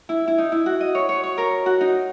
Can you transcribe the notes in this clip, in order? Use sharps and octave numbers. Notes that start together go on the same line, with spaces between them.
E4
E4
D#4
E4
F#4
D#5
C#5
C#5
C#5
A#4
F#4
D#4